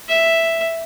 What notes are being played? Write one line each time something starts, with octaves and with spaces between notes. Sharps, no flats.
E5